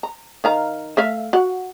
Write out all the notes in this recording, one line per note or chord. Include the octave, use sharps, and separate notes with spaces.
A#5
D#3 F5 A#5
A3 E5 F5
F#4 F#5